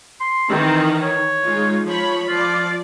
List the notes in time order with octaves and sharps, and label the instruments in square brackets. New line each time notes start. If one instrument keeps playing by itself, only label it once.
[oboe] C6
[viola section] D#3 E3 [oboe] C4
[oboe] C#5
[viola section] G#3 D#4 F4
F3 C#5 B5
[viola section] F3 D5 [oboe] F4